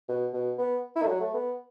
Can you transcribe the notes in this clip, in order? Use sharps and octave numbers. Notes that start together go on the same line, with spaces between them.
B2
B2
B3
E4
A3
F#3
A3
B3